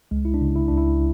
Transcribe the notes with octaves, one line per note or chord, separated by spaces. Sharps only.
C#2 G#3
E4
D4
C#3
E4
C#2 D4
E4